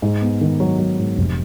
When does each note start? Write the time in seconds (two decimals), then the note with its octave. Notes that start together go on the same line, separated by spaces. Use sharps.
0.02 G#2
0.22 B3
0.41 D#3
0.60 F#3
0.79 F#3
0.98 G#2
1.17 F1